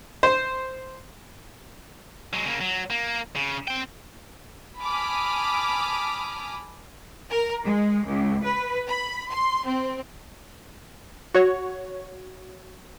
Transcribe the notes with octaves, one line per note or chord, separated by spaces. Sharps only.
C5
F#3 G#3
C#3 A#3
F#3
A#3
C#3
C4 G5
G#5 A5 B5 D6 D#6 F6
A#4
G#3
C#2
B4
B5
C6
C4
F#4 C#5